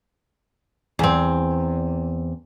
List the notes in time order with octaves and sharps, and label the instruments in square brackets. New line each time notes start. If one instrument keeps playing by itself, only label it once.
[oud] E2 C4